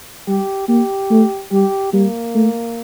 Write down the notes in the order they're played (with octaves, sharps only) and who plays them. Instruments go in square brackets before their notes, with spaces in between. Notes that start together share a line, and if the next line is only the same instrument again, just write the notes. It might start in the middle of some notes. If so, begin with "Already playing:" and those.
[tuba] G3 [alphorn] G4
[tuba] A#3 [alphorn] G4
[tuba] A3
[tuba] G3 [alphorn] G4
[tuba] G3 [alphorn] A#3
[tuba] A3